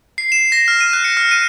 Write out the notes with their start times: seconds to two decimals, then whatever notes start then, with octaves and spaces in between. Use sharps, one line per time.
0.18 C7
0.32 E7
0.52 A#6
0.68 F6
0.81 D#7
0.93 F#6
1.04 C#7
1.17 F6
1.31 D#7